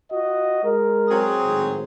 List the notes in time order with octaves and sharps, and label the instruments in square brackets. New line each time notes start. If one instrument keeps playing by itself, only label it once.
[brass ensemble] F4 F#4 D#5
G#3 A#4
[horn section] F#3 C4 G#4
[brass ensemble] G#1 A2